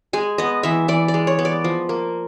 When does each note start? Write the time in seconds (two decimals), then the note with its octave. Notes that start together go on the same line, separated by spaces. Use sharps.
0.13 G#3 G#5
0.38 B3 D#5
0.63 E3 E5
0.88 E3 D5
1.08 D5
1.14 G#3
1.27 C#5
1.39 B3
1.45 D5
1.64 F3
1.89 A#3